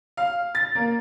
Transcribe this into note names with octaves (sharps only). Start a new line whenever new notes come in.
F5
A6
A#3